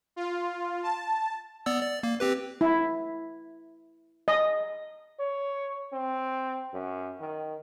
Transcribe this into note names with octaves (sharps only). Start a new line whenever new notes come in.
F4
A5
B3 D5 E6
D5
A#3
C4 G4 B4
E4
D#5
C#5
C4
F#2
D#3